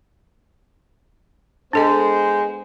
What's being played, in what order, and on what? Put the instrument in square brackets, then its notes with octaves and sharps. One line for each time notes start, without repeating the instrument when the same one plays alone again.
[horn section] G#3 B3 C5 [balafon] D4 A4 D#5